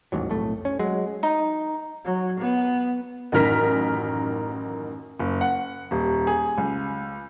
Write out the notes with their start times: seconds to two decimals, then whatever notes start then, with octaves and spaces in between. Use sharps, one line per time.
0.12 A1 D#2 G#2 F#3
0.29 B1 F2 A2 A3
0.65 C#4
0.79 F#3 G#3
1.23 D#4
2.05 F#3
2.39 B3
3.32 A1 F#2 D#3 A#4 F6 B6
5.19 F#1
5.41 F#5
5.91 D#1
6.27 G#4
6.58 C#2